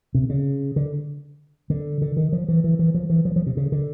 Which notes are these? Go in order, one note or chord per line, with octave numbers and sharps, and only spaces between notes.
C3
C#3
D3
D3
D3
D#3
F3
E3
E3
E3
F3
E3
F3
F3
C3
C#3
D3